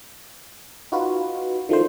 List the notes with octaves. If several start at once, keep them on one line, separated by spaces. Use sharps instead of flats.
D#4 F4 F#4 B4
D#3 F3 A3 D4 C5